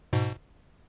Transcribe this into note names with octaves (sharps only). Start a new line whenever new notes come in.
G#2 B2